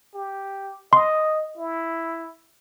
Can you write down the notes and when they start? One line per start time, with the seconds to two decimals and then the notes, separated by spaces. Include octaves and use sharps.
0.14 G4
0.93 D#5 C6
1.57 E4